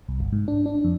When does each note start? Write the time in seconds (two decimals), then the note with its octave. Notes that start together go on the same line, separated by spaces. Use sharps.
0.08 C2
0.20 G1
0.32 G#2
0.48 D4
0.66 D4
0.84 F2